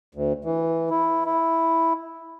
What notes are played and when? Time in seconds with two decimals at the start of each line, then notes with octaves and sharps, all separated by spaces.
0.15 D2
0.45 E3
0.90 E4
1.25 E4